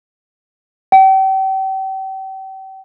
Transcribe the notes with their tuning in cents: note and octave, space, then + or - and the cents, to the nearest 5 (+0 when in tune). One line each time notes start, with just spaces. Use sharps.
G5 -40